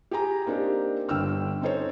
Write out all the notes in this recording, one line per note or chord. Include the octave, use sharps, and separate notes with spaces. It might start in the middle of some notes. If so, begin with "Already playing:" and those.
G4 G#4 G#5 A#5
A#3 C4 D4 D#4 G4
G1 D3 G5 E6 F6
C4 C#4 D#4 A4 C5 C#5